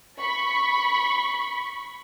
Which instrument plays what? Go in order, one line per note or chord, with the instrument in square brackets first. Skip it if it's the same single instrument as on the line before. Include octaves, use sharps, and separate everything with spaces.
[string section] B5 C#6 B6